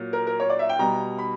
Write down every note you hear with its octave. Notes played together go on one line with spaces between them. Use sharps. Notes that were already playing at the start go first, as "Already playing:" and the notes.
Already playing: A#2 F#3
A#4
A#4
C#5
D5
E5
G5
B2 G3 A#5
B5